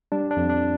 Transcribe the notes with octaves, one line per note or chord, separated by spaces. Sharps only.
G3 D4
D4
F2
D4